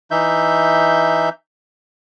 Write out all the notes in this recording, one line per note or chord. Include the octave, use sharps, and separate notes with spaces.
E3 D#4 E5 G6